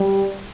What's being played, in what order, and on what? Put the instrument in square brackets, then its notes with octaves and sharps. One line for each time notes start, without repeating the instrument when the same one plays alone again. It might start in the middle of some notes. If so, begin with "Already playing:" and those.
Already playing: [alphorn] G3